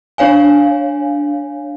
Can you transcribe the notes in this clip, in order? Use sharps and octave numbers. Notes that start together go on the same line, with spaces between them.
D4 C#5 F5 G#5